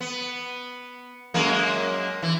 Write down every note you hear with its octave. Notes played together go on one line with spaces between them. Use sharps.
B3
F#2 G#3 A#3
E3